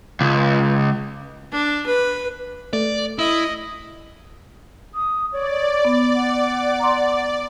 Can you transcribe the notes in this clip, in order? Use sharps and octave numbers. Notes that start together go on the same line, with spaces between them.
C#2
D4
B4
A3 D5
E4 D#5
D#6
C#5 D5
B3
F#5
A#5 C6